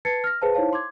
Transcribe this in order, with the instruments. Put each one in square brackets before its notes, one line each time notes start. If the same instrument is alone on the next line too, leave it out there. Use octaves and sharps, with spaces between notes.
[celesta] B4 A5 G#6 A6 C7 C#7
F6 A#6
G#4 B4 C5 F5 A5
D#4 E4 C5 C#5 F5 A5
C6 D6 G#6